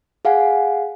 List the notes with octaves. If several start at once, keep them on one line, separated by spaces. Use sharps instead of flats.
G#4 F5 F#5 G#5